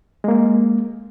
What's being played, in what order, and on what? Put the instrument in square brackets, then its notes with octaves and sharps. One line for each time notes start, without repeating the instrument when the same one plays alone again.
[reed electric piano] G#3 A#3